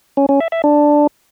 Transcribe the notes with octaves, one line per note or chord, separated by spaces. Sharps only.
C#4
C#4
E5
E5
D4